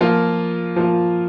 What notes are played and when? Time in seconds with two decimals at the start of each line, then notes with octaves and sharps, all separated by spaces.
0.01 F3 A#3 F4
0.76 F3 A#3 F4